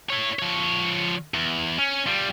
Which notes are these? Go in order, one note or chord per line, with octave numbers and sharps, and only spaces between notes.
E4 C#5
F3 C#5
E2
C#4
G3 F4